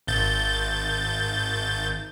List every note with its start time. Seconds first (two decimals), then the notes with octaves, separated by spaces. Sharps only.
0.07 G#1 G6 A6